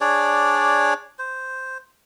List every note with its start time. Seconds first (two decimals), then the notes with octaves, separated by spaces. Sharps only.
0.01 D4 G#4 C#5 D5
1.19 C5